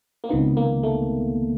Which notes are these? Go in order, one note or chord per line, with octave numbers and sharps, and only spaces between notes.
A#3
C#2 C3 D#3 B3
A#3
A3